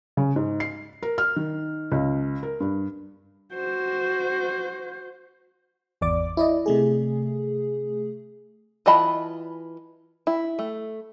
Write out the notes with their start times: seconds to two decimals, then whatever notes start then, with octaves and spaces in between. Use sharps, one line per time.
0.17 C#3
0.36 G#2
0.60 C7
1.03 A#4
1.18 F6
1.36 D#3
1.92 C#2
2.43 A#4
2.60 G2
3.53 F#4 C5
6.01 G#1 E2 D5 D6
6.37 E4 D5 D#5
6.66 C3 A3 G#4
8.86 E3 F4 D#5 A5 B5
10.27 E4
10.59 A3